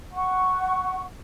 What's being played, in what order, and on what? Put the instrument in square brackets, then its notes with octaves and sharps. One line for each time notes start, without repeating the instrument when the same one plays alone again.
[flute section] F#5 C#6